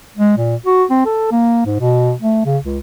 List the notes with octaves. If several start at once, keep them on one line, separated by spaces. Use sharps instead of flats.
G#3
A#2
F#4
C4
A4
A#3
G#2
B2
A3
C#3
C#2